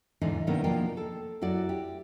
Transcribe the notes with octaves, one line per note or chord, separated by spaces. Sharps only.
E2 G#2 D3 E3 D#4
G2 C3 D#3 A#3 B3
B2 F3 A#3 D4 G5
A4
F#2 E4 F#4 D5
G4